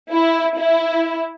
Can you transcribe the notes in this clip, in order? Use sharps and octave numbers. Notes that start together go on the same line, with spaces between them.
E4
E4